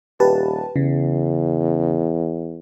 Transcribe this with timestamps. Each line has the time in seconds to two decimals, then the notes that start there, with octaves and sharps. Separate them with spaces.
0.20 D#1 G4 B4 A5
0.76 E2 C#3